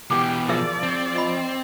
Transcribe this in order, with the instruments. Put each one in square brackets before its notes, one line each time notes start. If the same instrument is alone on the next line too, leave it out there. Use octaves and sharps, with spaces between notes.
[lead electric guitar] B2 E3 [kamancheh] G4 [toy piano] D6
[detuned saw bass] F3 [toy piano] G#4 A#4 E5 [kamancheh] D5
[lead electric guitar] C4
[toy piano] D#5 B5